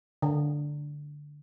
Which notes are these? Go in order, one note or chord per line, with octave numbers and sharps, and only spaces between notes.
D3